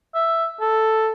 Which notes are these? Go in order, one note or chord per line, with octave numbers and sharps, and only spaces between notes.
E5
A4